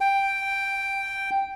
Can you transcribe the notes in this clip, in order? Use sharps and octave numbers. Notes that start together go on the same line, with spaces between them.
G5